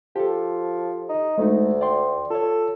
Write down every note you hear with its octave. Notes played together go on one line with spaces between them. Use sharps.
F3 G4 A4
D#4
D2 G#3 A3 D#4
D5 G5 C6
F4 A4 C#5